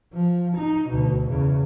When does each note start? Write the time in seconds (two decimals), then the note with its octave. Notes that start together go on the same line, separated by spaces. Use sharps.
0.13 F3
0.57 D#4
0.89 D2 B2
1.28 E2 C#3